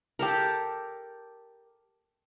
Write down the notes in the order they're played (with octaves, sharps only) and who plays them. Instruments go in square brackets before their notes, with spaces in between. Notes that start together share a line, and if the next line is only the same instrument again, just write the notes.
[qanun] G4 A4 A#4